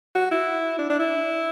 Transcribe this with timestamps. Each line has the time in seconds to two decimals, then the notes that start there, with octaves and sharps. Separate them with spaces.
0.15 F#4
0.31 E4
0.78 D4
0.90 D4
0.99 E4